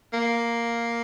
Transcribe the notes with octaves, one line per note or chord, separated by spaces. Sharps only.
A#3